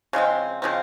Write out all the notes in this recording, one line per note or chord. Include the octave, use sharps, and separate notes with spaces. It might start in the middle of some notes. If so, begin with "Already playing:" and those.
C#3 F3 G#3 C4
C#3 F3 G#3 C4